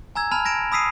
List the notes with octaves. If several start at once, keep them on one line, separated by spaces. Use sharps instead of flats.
G#5 A#5 E6 G#6
G#5 A5 B5 F6 F7
G#6 A#6 D7 E7
B5 D#6 E6 B6 C7 D#7